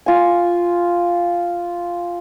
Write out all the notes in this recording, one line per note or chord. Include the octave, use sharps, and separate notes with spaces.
F4 G#5